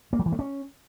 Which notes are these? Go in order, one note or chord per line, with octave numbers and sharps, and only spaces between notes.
A#3
F#3
E3
A3
C#4